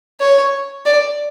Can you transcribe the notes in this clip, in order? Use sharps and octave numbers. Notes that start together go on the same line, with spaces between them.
C#5
D5